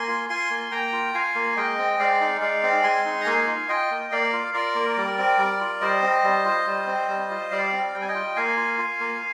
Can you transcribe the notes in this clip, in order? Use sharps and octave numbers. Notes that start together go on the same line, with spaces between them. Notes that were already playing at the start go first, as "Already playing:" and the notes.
Already playing: A#3 G#5 C6
F4
F4 G#5 C6
A#3
A#3 G5 A#5
F4
F4 F5 G#5
A#3
G#3 D#5 G5
C4
G#3 D5 F5
D#4
G#3 D5 F5
C4
G#3 G#5 C6
D#4
A#5
A#3 F5 G#5
F4
F4 D#5 G5
A#3
A#3 D5 F5
F4
F4 A#4 D5
A#3
G3
C4
G3
F4
G3 C5 D#5
C4
G3
F4
G3
C4
G3
F4
G3 D5 F5
C4
G3 G5
G#5
D#5 G5
F4
A#3 F5 G#5
F4
F4
A#3